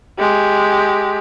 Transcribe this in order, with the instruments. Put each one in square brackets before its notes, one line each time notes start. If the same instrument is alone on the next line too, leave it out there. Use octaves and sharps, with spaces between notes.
[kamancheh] G#3 G4